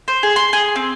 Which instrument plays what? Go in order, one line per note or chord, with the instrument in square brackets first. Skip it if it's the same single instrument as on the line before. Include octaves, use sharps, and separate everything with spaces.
[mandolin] C5
G#4
C6
G#4
C4